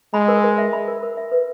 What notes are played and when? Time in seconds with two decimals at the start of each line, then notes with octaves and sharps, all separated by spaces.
0.14 G#3 B5
0.28 A#4
0.44 A#4
0.58 E5
0.73 B5
0.88 A#4
1.03 A#4
1.17 E5
1.32 B4